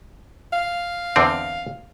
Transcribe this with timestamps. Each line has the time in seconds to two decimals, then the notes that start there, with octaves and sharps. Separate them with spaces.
0.53 F5
1.16 E2 D3 C4